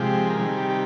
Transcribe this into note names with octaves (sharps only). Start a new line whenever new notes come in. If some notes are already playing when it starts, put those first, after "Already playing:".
Already playing: C3 F3 G#3 G4
A#4
C3 D#3 G3 G#4
G4
G4